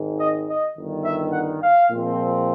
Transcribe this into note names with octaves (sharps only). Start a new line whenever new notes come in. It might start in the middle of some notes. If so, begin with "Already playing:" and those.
Already playing: G#1 G#2 D#3
D#5
D#5
G1 G2 D#3
E5
F#5
F5
A#2 F3 G#3 C4